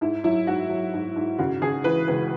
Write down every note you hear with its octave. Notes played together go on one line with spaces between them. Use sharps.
G#2 E4
F#3 E4
G#2 F#4
F#3
G#2
G#2
C#3 F#4
C#3 G#4
E3 B4
C#2 B4